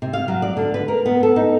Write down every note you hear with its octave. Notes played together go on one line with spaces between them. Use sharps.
C3
F5
F#3
D5
D3
B4
A#4
B3
A4
D#4